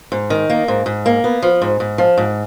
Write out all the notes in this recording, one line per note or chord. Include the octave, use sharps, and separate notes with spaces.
G#2
D#3
A#3
G#2
G#2
A#3
B3
F3
G#2
G#2
F3
G#2